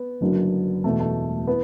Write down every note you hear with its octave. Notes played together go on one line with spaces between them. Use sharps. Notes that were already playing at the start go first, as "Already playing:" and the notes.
Already playing: B3
F#1 F#2 D3 F#3
E1 E2 B2 F#3 A3
A3
E3 B3